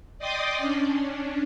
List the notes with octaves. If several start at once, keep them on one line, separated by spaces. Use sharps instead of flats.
D5 D#5 G5 C6 D6 D#6
C#4 D4